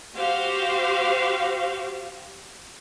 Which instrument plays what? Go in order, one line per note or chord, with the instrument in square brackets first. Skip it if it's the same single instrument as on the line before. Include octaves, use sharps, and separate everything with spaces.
[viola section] F#4 G4 C5 F5